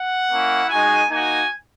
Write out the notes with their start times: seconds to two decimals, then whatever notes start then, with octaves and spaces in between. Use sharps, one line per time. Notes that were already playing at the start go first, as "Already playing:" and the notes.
Already playing: F#5
0.32 A#3 C#4 E4
0.70 G#3 D#4 F#4 G#5
1.10 A#3 D#4 F#4 G#5